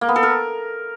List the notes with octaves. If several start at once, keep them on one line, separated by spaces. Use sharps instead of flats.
A#3
B3
A4
A#4